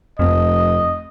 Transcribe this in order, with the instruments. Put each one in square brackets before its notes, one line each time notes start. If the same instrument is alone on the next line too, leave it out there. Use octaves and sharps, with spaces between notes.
[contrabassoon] F1 [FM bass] F2 [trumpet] D#5